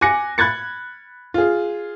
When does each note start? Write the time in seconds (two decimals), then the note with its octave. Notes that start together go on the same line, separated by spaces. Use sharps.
0.01 G#5 D6 F#6 A#6 C#7
0.38 B5 F#6 G#6 A6 C#7
1.34 F4 G#4